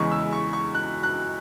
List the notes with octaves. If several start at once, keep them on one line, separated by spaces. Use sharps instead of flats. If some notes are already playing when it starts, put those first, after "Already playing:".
Already playing: E2 C#3 E3 G#3 C#6
E6
C#6
C#6
F#6
F#6